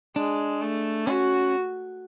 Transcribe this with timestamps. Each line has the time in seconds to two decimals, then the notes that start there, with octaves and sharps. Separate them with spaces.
0.16 G#3 D4
0.62 A3
1.07 C#4 F#4